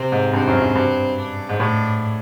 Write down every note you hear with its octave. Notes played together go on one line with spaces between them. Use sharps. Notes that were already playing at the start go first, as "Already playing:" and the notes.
Already playing: C3 C4
G#2
G2 C4
F#2
F#2
G2
D4
G#2
A2 D4